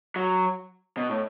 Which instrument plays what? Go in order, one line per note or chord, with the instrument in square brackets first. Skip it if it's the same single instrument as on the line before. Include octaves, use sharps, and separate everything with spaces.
[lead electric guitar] F#3
B2
A2